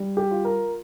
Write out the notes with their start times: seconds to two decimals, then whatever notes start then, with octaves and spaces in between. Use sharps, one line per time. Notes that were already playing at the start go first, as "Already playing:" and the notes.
Already playing: G3
0.17 G4
0.31 F4
0.45 A#4